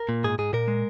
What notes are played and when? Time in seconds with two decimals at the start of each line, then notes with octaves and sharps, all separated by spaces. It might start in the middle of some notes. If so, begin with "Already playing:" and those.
Already playing: A#4
0.09 A#2
0.24 G#2 G#4
0.39 G#2 G#4
0.53 A#2 A#4
0.68 G#3